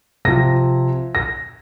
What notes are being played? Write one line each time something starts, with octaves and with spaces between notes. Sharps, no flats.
C3 F3 A#6
A#6